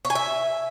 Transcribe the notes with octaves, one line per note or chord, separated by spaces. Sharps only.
C#5
G#5
E5